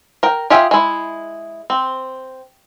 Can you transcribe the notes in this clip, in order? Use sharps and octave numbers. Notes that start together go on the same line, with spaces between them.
A#4 G5
F4 G4 G#4 E5 G5
G#3 E4
C4